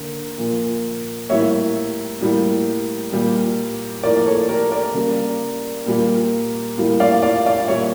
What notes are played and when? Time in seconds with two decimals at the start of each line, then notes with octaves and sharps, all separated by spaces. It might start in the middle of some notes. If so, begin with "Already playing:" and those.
Already playing: D3 A#3
0.38 A#2 F3 A#3
1.29 A2 G3 A#3 C#5 E5
2.21 A2 G3 A#3
3.12 A#2 G3 A#3
4.03 A2 F3 A#3 A#4 D5
4.26 A4 C#5
4.49 G4 A#4
4.71 A#4 D5
4.94 C#3 G3 A#3
5.86 A#2 G3 A#3
6.78 A2 G3 A#3
7.00 D5 F5
7.23 D5 F5
7.46 D5 F5
7.68 A#2 G3 A#3 C#5 E5